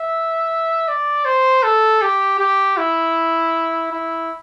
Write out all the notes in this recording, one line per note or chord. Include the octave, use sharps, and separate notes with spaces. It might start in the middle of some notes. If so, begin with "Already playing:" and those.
Already playing: E5
D5
C5
A4
G4
G4
E4
E4